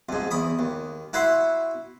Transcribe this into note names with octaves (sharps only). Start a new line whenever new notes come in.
F2 G#2
E2 B5 D#6
D#2
E4 F#4 B4 E5 C6